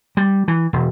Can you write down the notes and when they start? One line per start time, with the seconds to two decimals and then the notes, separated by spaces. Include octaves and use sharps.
0.17 G3
0.48 E3
0.73 E1